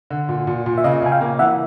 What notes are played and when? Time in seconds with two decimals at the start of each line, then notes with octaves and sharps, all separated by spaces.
0.11 D3
0.29 A#2
0.47 A#2
0.66 A#2
0.78 E5
0.84 C#3 D#5 F5
1.02 C#3 G#5
1.11 F5 G5
1.21 A#3
1.39 E3 E5 F#5